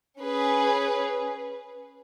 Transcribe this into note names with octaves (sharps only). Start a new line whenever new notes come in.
C#4 G#4 B4